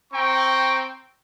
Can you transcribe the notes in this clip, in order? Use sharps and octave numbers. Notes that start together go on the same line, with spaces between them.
C4 G5 A#5 C#6